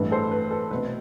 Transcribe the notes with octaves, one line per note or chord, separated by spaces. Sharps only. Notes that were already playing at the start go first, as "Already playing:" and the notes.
Already playing: A1 G2 E3 A3
A4 C5
B4
A4
C2 B2 A3 C4 B4